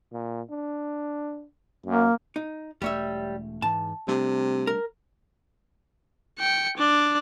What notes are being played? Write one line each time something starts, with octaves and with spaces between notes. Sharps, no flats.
A#2
D4
F#2 A#3
D#4
E1 G3 A3 C#5 E5
G#2 E3 A5
C3 G3 A3 D4
A#4
G5 C#7
D4 D5